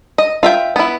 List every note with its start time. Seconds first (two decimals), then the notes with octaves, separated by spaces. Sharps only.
0.18 D#5
0.43 F4 E5 G5
0.76 B3 E4